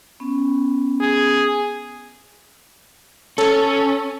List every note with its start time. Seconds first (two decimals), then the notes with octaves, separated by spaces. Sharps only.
0.20 B3 C#4
1.00 G#4
3.38 C#4 A4